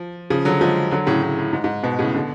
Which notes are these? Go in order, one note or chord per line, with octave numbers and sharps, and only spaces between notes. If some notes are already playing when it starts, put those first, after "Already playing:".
Already playing: F3
C#3 F3
D3 F#3
F3 G#3
D3 F#3
A2 C#3
A2
A2
G#2
G#2
G#2 B2
A2 C#3
B2 D3